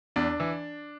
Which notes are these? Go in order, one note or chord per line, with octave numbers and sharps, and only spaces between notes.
E2 D4
E3